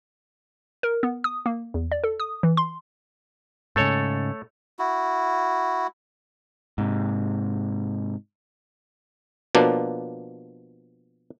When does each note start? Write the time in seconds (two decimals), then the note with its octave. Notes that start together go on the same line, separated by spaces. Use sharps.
0.83 A#4
1.03 B3
1.24 D#6
1.46 A#3
1.74 E2
1.92 D5
2.04 A4
2.20 D#6
2.43 E3
2.57 C6
3.76 G#2 C#3 A3 A4 C#5
4.79 E4 F#4
6.78 G#2 C3
9.55 B2 F3 A#3 D4